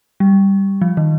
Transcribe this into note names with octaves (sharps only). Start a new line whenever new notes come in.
G3
F3
D#3